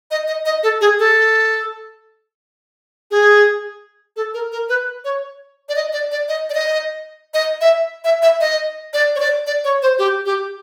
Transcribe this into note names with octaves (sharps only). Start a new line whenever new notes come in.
D#5
D#5
D#5
A4
G#4
A4
G#4
A4
A#4
A#4
B4
C#5
D5
D#5
D5
D5
D#5
D5
D#5
D#5
E5
E5
E5
D#5
D5
C#5
D5
D5
C#5
C5
G4
G4